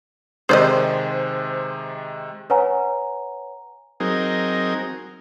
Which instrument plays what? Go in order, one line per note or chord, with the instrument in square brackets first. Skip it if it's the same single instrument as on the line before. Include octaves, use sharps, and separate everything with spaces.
[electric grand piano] C3 D#3 G#3 [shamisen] G#4 D5 D#5 [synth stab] C5
[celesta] B4 C#5 F#5 G#5 A#5
[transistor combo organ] F#3 C4 D#4 G#4 A#4